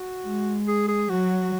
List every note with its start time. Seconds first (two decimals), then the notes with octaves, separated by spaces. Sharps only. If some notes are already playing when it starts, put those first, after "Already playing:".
Already playing: F#4
0.25 G#3
0.68 G#4
0.88 G#4
1.09 F#3 F#4